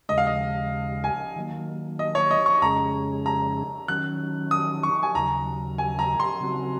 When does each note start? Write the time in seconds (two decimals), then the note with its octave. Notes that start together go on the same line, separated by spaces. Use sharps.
0.09 D#2 C#3 G#3 D#5
0.18 F5
0.27 D#5
1.04 G#5
1.36 D#3 F#3 A#3
1.99 D#5
2.15 C#5
2.31 D#5
2.46 C#6
2.62 F2 C#3 G#3 C#4 G#4 A#5
3.26 A#5
3.88 D#3 F#3 C#4 F#6
4.51 D#6
4.83 C#6
5.03 G#5
5.15 D#2 C#3 F#3 A#5
5.78 G#5
5.99 A#5
6.20 C6
6.40 C#3 F#3 C4 F#4